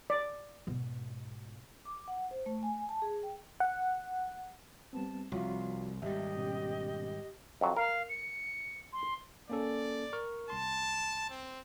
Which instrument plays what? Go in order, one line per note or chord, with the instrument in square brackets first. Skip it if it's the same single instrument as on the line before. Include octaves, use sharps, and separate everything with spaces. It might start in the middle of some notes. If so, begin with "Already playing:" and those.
[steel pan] D5
[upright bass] G#2 B2
[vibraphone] D6
F#5
C5
A3
G#5
A5
G#4
G5
[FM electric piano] F#5
[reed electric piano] G3 B3 C4 [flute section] A5
[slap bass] C2 [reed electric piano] F3 F#4 C#5 [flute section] F4
[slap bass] G#1 G3 [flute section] G4 D#5 [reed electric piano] E5
[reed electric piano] B2 B3 C#4
[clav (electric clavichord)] F2 F#3
[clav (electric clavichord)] A#4 [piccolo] F5
[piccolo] C#7
C6
[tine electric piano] A#3 C#4 A4 [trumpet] D5
[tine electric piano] A#4 C#6 F6
[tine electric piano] C2 C6 [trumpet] A5
[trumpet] C4